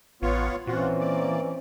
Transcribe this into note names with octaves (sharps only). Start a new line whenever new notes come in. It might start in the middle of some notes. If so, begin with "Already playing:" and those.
A1 B3 F4 C#5
A#2 E3 C4 C#4 F4 F#4
A#3 D5